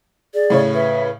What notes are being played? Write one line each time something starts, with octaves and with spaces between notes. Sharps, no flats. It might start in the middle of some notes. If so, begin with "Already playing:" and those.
G#4 D5
A2 C#3 C#5
B4 E5